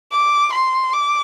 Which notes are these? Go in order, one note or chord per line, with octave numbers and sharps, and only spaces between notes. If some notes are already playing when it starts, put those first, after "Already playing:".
D6
C6
D6